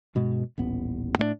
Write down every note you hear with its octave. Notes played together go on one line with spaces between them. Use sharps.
G2 B2 G#3 B3
D#1 A1 B3
A2 A3 A#3 D4